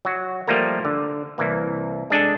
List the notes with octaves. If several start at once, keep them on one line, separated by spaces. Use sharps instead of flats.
F#3 F#4
F3 G3 A3 A#3 A#4
D3
C2 E3 A#3
G#3 D4 G#4 A4